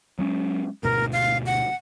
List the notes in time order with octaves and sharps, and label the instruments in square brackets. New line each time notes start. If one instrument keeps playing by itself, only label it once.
[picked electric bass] F#3 G#3 C#4
[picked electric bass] D2 G#2 B2 [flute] A#4
[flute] F5
F#5